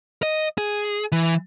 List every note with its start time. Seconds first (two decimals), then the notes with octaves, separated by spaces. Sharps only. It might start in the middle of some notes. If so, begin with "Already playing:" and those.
0.23 D#5
0.58 G#4
1.12 E3